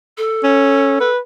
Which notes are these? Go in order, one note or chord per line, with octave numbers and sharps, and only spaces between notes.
A4
C#4
B4